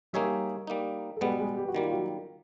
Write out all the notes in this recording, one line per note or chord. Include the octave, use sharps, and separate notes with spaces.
G3 A#3 D#4 G4 G#4 C#5 E5
G3 A#3 D#4
A4
B2 G3 G#3 B3 G#4
G#3 G#4
G4
F#4
D#3 G3 A#3 F4
F#3 F#4